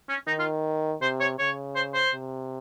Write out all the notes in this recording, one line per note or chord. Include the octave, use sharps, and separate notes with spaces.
C#4
D#3 D#4
F4
C3 C5
C#5
C#3 C#5
C5
C5
C3